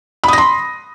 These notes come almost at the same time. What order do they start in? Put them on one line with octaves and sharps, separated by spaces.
B5 D#6 A#6 C6